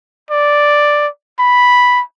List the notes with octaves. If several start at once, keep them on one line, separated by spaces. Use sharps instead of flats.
D5
B5